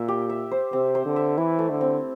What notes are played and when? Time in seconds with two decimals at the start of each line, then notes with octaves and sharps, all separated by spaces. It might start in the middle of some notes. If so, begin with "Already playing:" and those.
Already playing: A#2 E5
0.08 G4
0.30 E5
0.51 C5
0.73 C3 C4
0.95 C5
1.06 D3
1.16 E5
1.38 E3 E4
1.59 A3
1.70 D3
1.81 C4